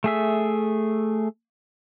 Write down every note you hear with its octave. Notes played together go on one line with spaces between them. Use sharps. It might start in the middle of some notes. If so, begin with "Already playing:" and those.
A3 G#4 E5